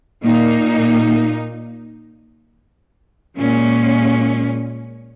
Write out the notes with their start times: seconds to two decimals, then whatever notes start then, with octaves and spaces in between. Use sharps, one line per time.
0.23 A#2 A#3 D#4
3.37 A#2 G#3 C#4